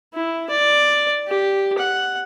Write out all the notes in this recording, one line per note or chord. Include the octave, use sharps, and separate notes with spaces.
E4
D5
G4
F#5